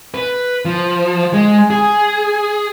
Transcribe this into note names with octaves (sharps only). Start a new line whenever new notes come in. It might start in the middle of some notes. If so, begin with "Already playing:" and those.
B4
F3
G#3
G#4